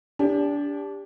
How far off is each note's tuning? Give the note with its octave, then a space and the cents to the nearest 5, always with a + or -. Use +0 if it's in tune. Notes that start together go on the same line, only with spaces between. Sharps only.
D4 -25 G4 +25